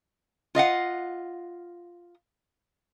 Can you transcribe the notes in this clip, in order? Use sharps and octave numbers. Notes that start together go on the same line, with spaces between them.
F4 D#5 F5 F#5